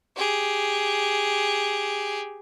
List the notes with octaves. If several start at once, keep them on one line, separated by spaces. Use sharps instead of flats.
G4 G#4